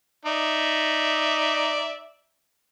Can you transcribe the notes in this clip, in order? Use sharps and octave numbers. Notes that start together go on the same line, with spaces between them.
D#4 D5 E5